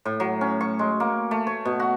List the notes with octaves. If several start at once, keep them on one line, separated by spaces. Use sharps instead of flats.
A2
F#3
C#4
C#6
G#3
A#3
A3
C#5
B2
F#4